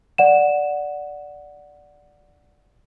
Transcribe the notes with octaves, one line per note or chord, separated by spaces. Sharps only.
D5 F#5 E7